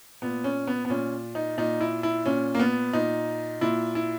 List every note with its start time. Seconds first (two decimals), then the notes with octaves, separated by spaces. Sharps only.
0.22 A#2 B3
0.44 C#4
0.67 B3
0.85 B3
0.90 A#2 C#4
1.35 D#4
1.58 A#2 D#4
1.81 E4
2.03 E4
2.26 A#2 C#4
2.55 A#3
2.59 B3
2.93 A#2 D#4
3.61 A#2 E4
3.95 E4